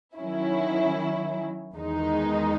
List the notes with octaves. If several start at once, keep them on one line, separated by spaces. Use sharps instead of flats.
D#3 F#3 C#4 E4
E2 D#3 G#3 D#4